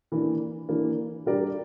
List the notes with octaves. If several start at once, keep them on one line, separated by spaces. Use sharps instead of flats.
E3 A#3 D4
E3 A#3 D4
G3 D4 G4 A#4 D5